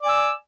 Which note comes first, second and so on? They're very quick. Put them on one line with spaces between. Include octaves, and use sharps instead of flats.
D5 G#5 E6